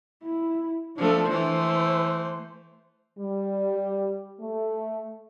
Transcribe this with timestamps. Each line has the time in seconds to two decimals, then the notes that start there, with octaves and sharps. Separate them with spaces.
0.23 E4
0.98 F3 A3 D4 A4
1.29 E3 A3 C5
3.19 G3
4.40 A3